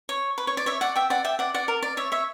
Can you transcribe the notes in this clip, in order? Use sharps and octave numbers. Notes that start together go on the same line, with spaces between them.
C#5
B4
C#5
D5
C#5 E5
D5 F#5
E5 G5
D5 F#5
E5 G5
D5 F#5
D5 F#5
A#4
D5
C#5 E5
C#5 E5